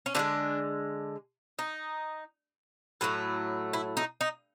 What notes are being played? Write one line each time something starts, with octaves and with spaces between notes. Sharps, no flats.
C#4
D3 F3 G#3 D4
D#4
A2 F#3 A3
E4
D#4
D#4